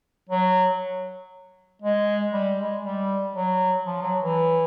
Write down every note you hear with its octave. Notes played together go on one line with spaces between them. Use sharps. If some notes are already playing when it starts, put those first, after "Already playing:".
F#3
G#3
G3
G#3
G3
F#3
F3
F#3
E3